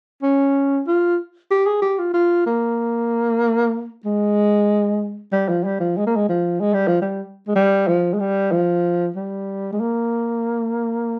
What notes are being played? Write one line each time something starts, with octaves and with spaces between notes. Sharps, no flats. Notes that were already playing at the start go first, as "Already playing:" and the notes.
C#4
F4
G4
G#4
G4
F4
F4
A#3
G#3
G3
F3
G3
F3
G#3
A#3
G#3
F3
G#3
G3
F3
G3
G#3
G3
F3
G#3
G3
F3
G3
G#3
A#3